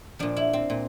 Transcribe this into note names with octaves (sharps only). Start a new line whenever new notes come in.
A#2 F3 D4
E4
C4
A#2